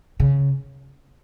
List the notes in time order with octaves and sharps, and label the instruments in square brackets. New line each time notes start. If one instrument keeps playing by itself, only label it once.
[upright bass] C#3